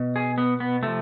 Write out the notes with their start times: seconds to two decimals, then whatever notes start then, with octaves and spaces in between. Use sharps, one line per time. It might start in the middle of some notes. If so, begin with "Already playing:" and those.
Already playing: B2
0.16 G#4
0.38 B3
0.60 B3
0.83 C3 F3 A3